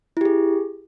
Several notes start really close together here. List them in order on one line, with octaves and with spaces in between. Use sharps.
E4 G4 G#4